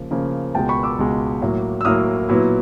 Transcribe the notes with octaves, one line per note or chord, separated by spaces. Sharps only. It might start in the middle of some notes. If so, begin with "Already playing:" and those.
Already playing: C#3 F3 A#3
C#3 F3 A#3
C#2 B2 G#3 G5 A5
B5 C#6
D6 E6
C#2 B2 G#3
A2 F#3 A#3
E6
A2 F#3 A#3 D#6 F6
A#2 F#3 B3 E4